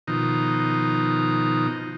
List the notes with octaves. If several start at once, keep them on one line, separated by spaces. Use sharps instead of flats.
B2 D#3 F3 D#4